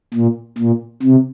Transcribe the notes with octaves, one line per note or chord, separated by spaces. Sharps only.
A#2
A#2
C3